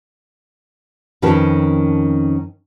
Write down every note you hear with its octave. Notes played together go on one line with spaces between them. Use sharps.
F2 D#3 C#4 A#4 B4 A5